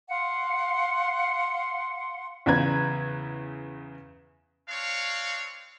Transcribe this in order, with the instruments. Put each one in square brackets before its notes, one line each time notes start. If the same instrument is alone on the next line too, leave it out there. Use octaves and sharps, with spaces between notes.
[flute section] F5 F#5 C6
[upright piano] E2 C#3 B4 A#5 G#6
[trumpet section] C4 D4 C#5 F5